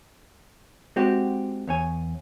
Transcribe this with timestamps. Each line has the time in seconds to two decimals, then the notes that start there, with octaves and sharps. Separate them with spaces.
0.96 G#3 C4 F#4 G4
1.67 E2 C#5 G#5